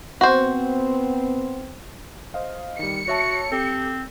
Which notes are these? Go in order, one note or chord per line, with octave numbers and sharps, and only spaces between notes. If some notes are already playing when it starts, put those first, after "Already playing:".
B3 C4 F#4 C5
C5 D#5 F5
D#3 G3 C#7
F#4 C#5 E5 A5
C4 G4 A4